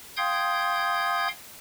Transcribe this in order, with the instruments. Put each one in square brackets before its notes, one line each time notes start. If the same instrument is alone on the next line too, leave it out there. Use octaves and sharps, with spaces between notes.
[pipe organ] F5 G5 C6 D#6 G6 G#6